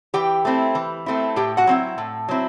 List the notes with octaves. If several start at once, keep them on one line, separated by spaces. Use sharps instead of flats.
E3 G4 G5
A3 C4 E4
E3
A3 C4 E4
A2 G4 G5
F#4 F#5
F#3 C4 E4
A2
F#3 C4 E4